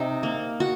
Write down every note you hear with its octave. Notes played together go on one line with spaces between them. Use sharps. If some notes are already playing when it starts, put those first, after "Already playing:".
Already playing: C3 D#4
A#3
F#4